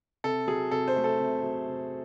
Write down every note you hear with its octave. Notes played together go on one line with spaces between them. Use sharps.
C3 A4
F#3 G#4
C3 A4
C5
A3
A4
C3
F#3
C3